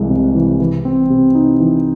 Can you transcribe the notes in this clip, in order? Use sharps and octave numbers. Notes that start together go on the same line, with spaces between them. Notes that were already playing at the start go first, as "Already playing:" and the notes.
Already playing: C2 E3 G#3
C3
E3
E3
C4
C3
D#4
E3